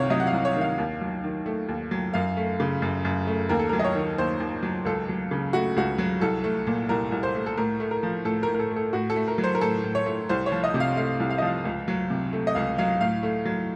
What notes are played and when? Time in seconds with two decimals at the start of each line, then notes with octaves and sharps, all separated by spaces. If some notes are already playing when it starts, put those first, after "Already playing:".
Already playing: C2 C3 D#3 C#5 F5
0.10 F#3 D#5
0.20 F#5
0.27 F5
0.33 C2
0.45 C#5
0.55 D#3
0.61 F5
0.78 D#2
1.01 F#3
1.24 D#3
1.46 A3
1.69 D#2
1.91 F#3
2.14 F#2 F5
2.37 A3
2.60 C#3
2.82 F#2
3.05 F#2
3.27 A3
3.49 D#2 A#4
3.59 A4
3.69 F#3 A#4
3.79 D#5
3.84 C#5
3.95 D#3
4.18 D#2 C5
4.40 D#2
4.63 F#3
4.85 C#2 A4
5.09 F#3
5.31 C#3
5.53 A3 F#4
5.76 C#2 F#4
5.98 F#3
6.21 C2 A4
6.44 A3
6.67 A#2
6.89 C2 A#4
7.12 C2
7.23 C5
7.35 A3
7.46 A4
7.57 A2 A#4
7.80 A3
7.91 A#4
8.03 F3
8.25 A2 A4
8.43 A#4
8.48 A2
8.54 A#4
8.59 A4
8.71 A3
8.76 A4
8.93 A2 F#4
9.10 A4
9.16 A3
9.28 A#4
9.38 F#3
9.44 C5
9.55 A#4
9.61 A2 A4
9.84 A2
9.95 C#5
10.06 A3
10.29 C2 C5
10.46 C#5
10.52 F3
10.64 D#5
10.74 C3
10.80 F5
10.97 A3 F5
11.20 C2
11.30 F5
11.38 D#5
11.42 F3 F5
11.65 C#2
11.88 F#3
12.10 C3
12.33 A3
12.47 D#5
12.55 C#2 F5
12.78 F#3 F5
13.01 A2 F5
13.23 A3
13.46 F#3